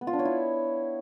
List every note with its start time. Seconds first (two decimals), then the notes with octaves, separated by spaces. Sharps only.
0.01 B3
0.07 F4
0.13 D4
0.19 C#5
0.25 E4